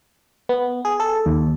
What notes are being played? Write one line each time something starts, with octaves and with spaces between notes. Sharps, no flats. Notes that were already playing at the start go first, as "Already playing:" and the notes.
B3
G#4
A4
D#2